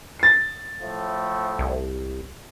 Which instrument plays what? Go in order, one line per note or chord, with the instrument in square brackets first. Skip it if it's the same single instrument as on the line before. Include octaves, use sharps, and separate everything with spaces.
[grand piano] A6 C7
[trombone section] A2 F3 A3
[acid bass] C2